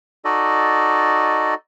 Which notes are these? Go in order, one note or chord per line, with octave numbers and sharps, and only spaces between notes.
D#4 F#4 A4 D5 D#5